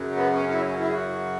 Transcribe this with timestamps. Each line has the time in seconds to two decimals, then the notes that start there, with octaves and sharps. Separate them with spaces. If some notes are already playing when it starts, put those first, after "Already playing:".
Already playing: F#2 C#3 F#3
0.16 B3
0.34 C#4
0.49 C#4
0.53 E4
0.66 C#4
0.79 E4
0.89 G#4
0.93 F#4